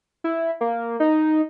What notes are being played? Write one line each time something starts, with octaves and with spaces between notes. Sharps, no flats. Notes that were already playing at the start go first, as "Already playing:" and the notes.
E4
A#3
D#4